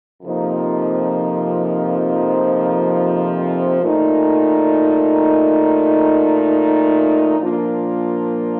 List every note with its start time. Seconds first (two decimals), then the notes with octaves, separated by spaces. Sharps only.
0.22 F2 C3 F3 A#3 D#4
3.81 A#2 A3 D#4
7.39 A#2 F3 A#3 D4 F4